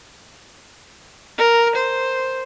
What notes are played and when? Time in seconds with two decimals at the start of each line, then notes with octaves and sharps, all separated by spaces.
1.38 A#4
1.76 C5